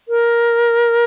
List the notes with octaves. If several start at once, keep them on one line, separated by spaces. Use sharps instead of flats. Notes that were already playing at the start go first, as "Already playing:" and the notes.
A#4